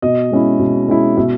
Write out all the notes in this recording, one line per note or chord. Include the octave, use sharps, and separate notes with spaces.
B2 D#5
G#3 C#4 E4
B2
G#3 C#4 E4
B2 E5